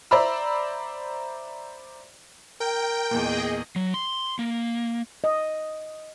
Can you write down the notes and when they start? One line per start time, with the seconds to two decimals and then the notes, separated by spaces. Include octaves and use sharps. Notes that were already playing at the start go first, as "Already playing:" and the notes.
0.11 C5 D5 E5 A#5 B5 E6
2.60 A#4 G5
3.11 E2 A#2 G#4 D#5
3.76 F#3
3.94 C6
4.39 A#3
5.24 D#5